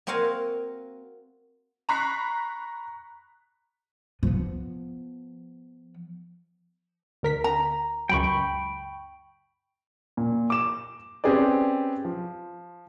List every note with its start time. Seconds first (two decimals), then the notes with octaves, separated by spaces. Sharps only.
0.07 A#3 C4 F#4 A#4 F5 G#5
1.89 A#5 B5 C#6 F#6 B6 C7
4.23 F3 B3
7.23 D2 A#4 B6
7.44 A#5
8.09 C#2 F#2 G5 B5 C#6
10.17 A#2
10.50 D6 E7
11.24 C4 C#4 G4 G#4 B4 D5
12.05 F3